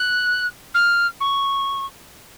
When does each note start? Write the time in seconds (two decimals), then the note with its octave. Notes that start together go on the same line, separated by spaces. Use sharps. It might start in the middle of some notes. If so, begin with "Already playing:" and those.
Already playing: F#6
0.74 F6
1.20 C#6